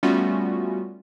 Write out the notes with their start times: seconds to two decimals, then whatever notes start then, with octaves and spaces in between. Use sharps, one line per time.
0.03 G3 A3 B3 C#4 F4 F#4